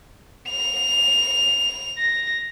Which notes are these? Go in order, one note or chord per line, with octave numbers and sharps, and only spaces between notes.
F7
A#6